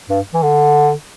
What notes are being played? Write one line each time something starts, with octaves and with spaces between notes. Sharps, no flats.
G2
E3
D3